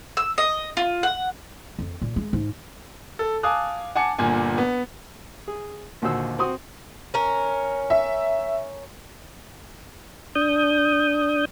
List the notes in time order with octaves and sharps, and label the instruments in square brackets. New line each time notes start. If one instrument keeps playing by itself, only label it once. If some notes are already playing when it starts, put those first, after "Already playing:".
[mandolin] E6
D#5
F4
F#5
[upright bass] F2
A#2
G#3
G#2
[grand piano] A4
F5 G#5 A5 D6 D#6 F#6
F#5 G#5 A5 D6 C#7
G1 A#2 G#5
B3
[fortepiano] G#4
A#1 D#2 D3 F#4 C5 E6
C4 F#4 C6 D#6
[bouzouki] C#4 A#4
[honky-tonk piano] E5
[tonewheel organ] D4 D#6 G6